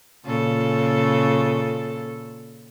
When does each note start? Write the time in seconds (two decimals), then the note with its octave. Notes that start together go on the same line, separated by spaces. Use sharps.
0.25 A#2 C#3 A4